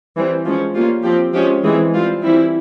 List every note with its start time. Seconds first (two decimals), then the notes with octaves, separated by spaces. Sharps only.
0.16 E3 G3 C4
0.45 F3 G#3 C#4 F4
0.75 G3 A#3 C#4 F4
1.04 F3 C4 G4
1.34 F3 G#3 C#4 G4
1.63 E3 G#3 C4 G#4
1.93 G3 C4 F4
2.23 E3 G3 C4 E4